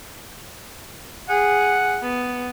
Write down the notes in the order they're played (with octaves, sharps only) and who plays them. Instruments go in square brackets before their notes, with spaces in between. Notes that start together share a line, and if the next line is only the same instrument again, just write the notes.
[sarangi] G#4 [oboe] F#5
[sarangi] B3